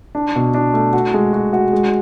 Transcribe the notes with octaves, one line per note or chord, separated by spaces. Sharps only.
D4
B2
D4
A3
F#4
G#3
F#4
F#4
G#3